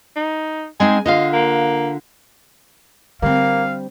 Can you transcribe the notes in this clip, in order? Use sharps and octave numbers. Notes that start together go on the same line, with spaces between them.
D#4
G#3 C4 D#4 G#5
D3 F4 D#5 F5
A#3
D3 G3 A#3 C4 F5